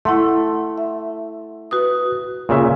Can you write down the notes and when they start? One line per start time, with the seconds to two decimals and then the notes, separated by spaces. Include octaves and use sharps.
0.05 A3 E4 F#5 C6
0.78 E5
1.71 F#4 B4 D#6
2.49 A#2 C#3 E5